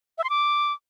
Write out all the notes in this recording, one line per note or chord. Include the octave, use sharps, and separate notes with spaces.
E5
C6
D6